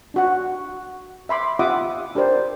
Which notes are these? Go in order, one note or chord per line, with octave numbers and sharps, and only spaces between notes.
D4 F#4 F#5
E5 B5 C6 D6
F4 G4 E5 F#5 D6 D#6
D4 G4 A#4 C5 D5